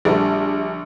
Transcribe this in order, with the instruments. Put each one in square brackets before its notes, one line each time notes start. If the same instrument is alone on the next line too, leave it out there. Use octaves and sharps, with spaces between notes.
[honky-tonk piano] A#1 [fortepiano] D3 G3 A3